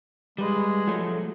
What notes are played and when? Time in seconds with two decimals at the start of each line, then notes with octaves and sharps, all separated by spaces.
0.38 G3 G#3 B4
0.87 F3 F#3 A3